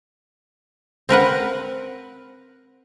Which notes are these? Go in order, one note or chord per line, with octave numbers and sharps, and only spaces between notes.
C4 A#4 B4 F#5